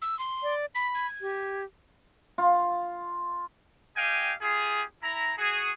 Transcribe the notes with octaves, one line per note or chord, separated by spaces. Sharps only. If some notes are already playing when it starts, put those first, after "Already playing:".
E6
C6
D5
B5 B6
G#6
G4
F4
G4 D#5 F5 G5 G#5
F4 G4 G#4
E4 A#5
F#4 G#4